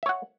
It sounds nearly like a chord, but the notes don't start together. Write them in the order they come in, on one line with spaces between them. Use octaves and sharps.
E5 C#5 F#5